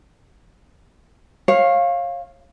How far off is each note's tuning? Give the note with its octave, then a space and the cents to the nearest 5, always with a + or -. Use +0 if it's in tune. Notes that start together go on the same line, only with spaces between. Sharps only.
C#5 -30 F5 +0